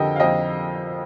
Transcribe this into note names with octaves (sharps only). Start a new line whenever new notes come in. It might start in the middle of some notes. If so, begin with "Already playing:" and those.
Already playing: F2 D3 G4 A4 A#4 D#5 G5
F5
F2 D#5 G5